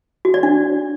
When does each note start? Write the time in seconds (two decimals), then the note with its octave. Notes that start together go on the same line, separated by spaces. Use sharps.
0.25 F#4
0.34 D5
0.43 D4